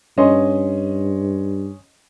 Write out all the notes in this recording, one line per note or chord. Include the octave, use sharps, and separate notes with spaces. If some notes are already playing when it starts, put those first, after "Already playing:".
G2 C#4 D#5 C6